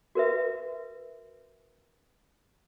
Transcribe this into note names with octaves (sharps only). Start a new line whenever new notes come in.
F#4 A#4 B4 E5